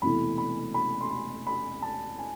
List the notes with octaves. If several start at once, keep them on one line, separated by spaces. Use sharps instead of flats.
E1 E2 C3 E3 A3 B5
B5
B5
C6
B5
B5
A5
G#5